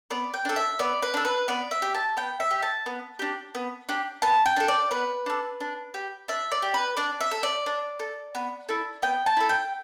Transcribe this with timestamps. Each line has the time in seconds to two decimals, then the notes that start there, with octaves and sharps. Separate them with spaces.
0.10 B3 D5
0.34 G5
0.45 D4 A4
0.56 E5
0.79 B3 D5
1.02 B4
1.14 D4 A4
1.25 B4
1.48 B3 D5
1.71 E5
1.82 G4
1.95 A5
2.17 B3 G5
2.40 E5
2.51 G4
2.62 A5
2.86 B3
3.19 D4 G4
3.55 B3
3.89 D4 G4
4.22 B3 A5
4.46 G5
4.56 D4 A4
4.68 D5
4.91 B3 B4
5.26 D4 A4
5.60 D4
5.94 G4
6.28 D4 E5
6.52 D5
6.62 G4
6.74 B4
6.97 D4 D5
7.21 E5
7.31 A4
7.43 D5
7.66 D4
7.99 A4
8.35 B3
8.69 E4 A4
9.02 B3 G5
9.26 A5
9.37 E4 A4
9.49 G5